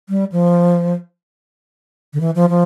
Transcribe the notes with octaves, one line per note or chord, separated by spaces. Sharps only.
G3
F3
D3
E3
F3
F3